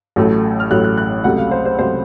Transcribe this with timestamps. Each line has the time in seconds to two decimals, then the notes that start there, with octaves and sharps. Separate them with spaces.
0.16 A1 A2 F#3 A3
0.60 F6
0.71 A1 A2 F#3 A3 F#6
0.84 F#6
0.97 F#6
1.24 C#2 C3 F#3 A3 F#5
1.38 F5
1.51 C5
1.65 C5
1.79 C#2 C3 F#3 A3 C5